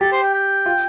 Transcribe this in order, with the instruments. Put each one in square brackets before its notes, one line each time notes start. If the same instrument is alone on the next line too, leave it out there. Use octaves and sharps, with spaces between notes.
[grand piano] G4 [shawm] A4
[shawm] C5
G5
G5
[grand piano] F4